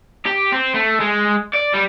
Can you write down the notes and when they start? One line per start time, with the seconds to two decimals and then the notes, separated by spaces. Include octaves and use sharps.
0.26 G4
0.53 C4
0.74 A3
1.00 G#3
1.53 D5
1.74 G3